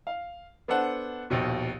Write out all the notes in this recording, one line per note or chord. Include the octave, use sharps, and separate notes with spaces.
F5
B3 D4 A4 C5 F#5
A#1 D#2 B2